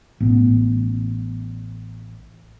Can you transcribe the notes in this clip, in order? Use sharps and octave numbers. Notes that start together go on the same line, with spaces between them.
A1 B3